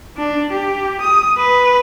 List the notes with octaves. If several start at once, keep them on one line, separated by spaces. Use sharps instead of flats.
D4
G4
D#6
B4